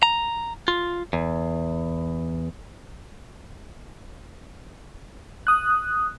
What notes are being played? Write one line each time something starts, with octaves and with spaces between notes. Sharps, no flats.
A#5
F4
E2
D#6 F#6